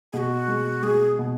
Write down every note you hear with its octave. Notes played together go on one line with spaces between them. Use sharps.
B2 F#4 G#4
G#3
G#3 G#4
B2